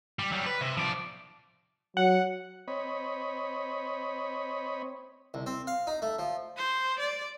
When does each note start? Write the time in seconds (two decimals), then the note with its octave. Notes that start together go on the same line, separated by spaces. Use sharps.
0.19 G3
0.32 F#3 G3
0.46 B4
0.61 C3
0.77 F3 D5
1.97 F#3 F#5
2.68 C4 C#5 D#5 B5
5.34 C2
5.46 C4
5.67 F5
5.87 D#4
6.02 A3
6.19 F3
6.56 C5
6.99 D5